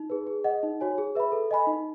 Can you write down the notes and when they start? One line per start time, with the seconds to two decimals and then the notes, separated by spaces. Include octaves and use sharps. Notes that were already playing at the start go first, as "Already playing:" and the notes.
Already playing: D#4
0.10 G#4 B4
0.27 G#4
0.44 D#5 F#5
0.63 D#4
0.81 F#4 C#5 G#5
0.98 G#4
1.15 B4 E5 B5
1.32 A4
1.51 D#5 G#5 B5
1.67 D#4